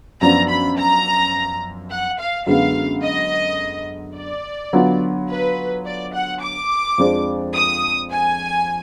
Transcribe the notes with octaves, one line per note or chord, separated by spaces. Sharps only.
F#2 F3 B3 D4 A#5
B5
A#5
F#5
F5
F#2 D3 G#3 B3 F5
D#5
D5
D3 F#3 B3 F4
B4
D5
F#5
D6
F2 F3 G#3 D4
D#6
G#5